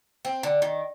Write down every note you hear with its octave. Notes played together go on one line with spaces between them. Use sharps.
C4
D3
D#3